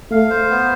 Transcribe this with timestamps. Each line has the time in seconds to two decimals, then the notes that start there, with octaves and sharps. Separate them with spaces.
0.11 A3 F5
0.30 C5
0.50 B3